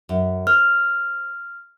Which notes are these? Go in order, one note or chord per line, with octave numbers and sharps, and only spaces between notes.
F#2
C5 F6